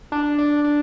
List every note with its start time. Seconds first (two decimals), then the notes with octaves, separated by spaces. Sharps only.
0.12 D4
0.38 D4
0.64 D4